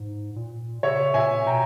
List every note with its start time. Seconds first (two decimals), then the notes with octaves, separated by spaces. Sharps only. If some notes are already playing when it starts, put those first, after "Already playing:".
Already playing: G#2
0.36 A#2
0.83 C#3 C#5 E5
1.14 A#2 E5 G#5
1.46 B2 G5 A#5